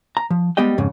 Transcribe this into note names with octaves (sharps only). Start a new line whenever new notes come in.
A#5
F3
G3 G#3 B3 G4 D#5 G5
F2 G#2 C#3